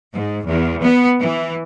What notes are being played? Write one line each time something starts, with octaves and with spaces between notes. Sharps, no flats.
G#2
E2
B3
E3